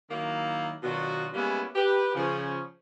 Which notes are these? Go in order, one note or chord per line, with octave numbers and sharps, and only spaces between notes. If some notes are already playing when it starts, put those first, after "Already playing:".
D#3 F#3 A#3 E4
B2 D#3 F#3 D4 F4 F#4
G3 G#3 A#3 B3 C#4 E4
G4 B4
C#3 F3 C#4